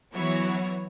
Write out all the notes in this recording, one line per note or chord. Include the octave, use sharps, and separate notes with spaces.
E3 F#3 B3 E4 F#4 C#5